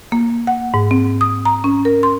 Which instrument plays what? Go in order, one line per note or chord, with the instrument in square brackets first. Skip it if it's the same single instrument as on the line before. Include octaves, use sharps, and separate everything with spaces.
[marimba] A#3
F#5
G#2
C4
D#6
A#5
C#4
A#4
C6